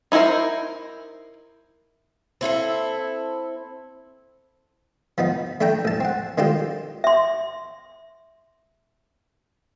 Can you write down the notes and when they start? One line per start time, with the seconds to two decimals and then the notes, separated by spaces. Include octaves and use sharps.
0.12 D#4 E4 A4 A#4 C5
2.41 C4 E4 G#4 A4
5.18 F3 B3 D#4
5.61 A3 D4 A4 G5 A#5
5.85 A1 A5
6.00 C4 F#5
6.38 D#3 C4 D4 F4 G4 A4
7.04 E5 C6